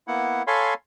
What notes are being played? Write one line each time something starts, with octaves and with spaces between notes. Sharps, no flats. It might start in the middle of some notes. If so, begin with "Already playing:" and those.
A#3 B3 E4 F#5
A4 C#5 F5 G#5 B5 C6